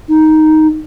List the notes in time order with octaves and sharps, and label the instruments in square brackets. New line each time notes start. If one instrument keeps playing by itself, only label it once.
[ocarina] D#4